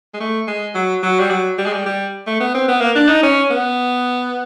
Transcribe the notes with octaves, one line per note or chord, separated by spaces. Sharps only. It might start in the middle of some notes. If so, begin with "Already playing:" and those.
G#3
A3
G#3
F#3
F#3
G3
F#3
G3
G#3
G3
G3
A3
B3
C4
B3
A#3
D4
D#4
C#4
B3